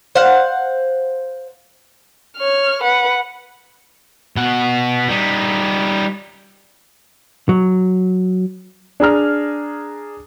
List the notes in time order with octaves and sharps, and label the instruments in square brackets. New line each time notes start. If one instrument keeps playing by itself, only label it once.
[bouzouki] C5 F5 F#5
[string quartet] C#5 F6
B4 F#5
[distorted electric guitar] B2 F#5
G3 D#4
[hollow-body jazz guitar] F#3
[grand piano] D4 G#4 A#5 F6